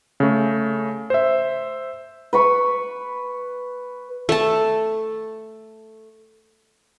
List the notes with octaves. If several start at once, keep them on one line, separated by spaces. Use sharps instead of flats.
C#3 A3
C5 E5
B4 B5 C#6
A3 A5